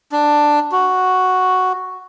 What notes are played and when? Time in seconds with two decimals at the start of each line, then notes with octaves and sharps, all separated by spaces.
0.12 D4
0.72 F#4